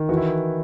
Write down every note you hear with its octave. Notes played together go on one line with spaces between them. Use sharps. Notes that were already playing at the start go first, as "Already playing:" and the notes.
Already playing: D#3
E3 F#4
E4